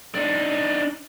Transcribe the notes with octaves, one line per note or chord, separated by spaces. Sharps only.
D4 D#4